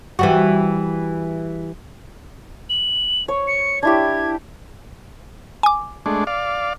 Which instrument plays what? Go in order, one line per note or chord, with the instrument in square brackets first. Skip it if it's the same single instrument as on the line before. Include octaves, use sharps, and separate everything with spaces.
[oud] E3 G3 F#4
[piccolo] F#7
[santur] C#5
[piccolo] C#7
[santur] D4 E4 G4 [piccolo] G#6
[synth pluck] G#5 D6
[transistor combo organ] G#3 A3 D4
D5 F5